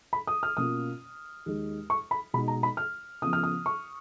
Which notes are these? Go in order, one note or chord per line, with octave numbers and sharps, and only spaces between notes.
B5
D#6
F6
B2 A#3 C#4 F4 D#6
D#2 D#3 G#3
C#6
B5
B2 G#3 D#4 B5
A#5
B5
F6
C#3 F3 B3 D#6
F6
D#6
C#6